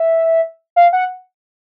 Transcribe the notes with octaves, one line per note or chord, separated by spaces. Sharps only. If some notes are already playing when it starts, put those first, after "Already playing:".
Already playing: E5
F5
F#5